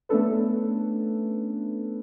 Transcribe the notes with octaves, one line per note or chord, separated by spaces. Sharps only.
A3 B3 C#4 D4 A4 B4